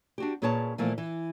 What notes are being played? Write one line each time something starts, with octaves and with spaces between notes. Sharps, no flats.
D4 F#4 G4
A#2 C#4 G#4 B4 C#5 A5
A#2 E3 F3 A3 A#3
E3